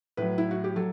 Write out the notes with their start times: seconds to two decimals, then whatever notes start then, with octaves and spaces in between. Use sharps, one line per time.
0.17 A2 F#3 B4
0.38 E4
0.51 F#4
0.64 G4
0.76 F#3 A4